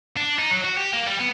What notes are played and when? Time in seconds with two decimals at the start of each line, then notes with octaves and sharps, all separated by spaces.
0.17 D4
0.39 D#4
0.51 F#3
0.65 F#4
0.77 G4
0.93 A#3
1.07 G3
1.20 B3